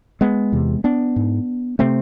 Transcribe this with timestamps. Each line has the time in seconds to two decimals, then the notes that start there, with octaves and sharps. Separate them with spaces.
0.21 G#3 B3
0.52 E2 C3
0.84 B3 D4
1.16 G#2
1.79 C3 A3 C4